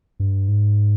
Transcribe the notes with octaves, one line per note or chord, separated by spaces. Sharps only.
G2
G#2